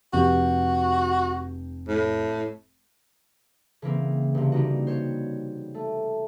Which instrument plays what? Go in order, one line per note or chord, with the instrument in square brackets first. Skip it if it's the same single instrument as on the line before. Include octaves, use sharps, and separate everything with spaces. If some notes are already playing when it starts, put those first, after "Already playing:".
[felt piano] F1 G4 [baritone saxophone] F#4
[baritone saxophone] A2
[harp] C#3 E3 A#3 C4
G1 C3
G3 A#3 D#4 F#4
C5 C#5
A3